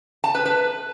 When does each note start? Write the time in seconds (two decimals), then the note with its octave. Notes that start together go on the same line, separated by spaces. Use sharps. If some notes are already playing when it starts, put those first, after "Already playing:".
0.24 A5
0.35 B4
0.45 B4